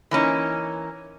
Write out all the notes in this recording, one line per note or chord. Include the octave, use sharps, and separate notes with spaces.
E3 A#3 C#4 D#4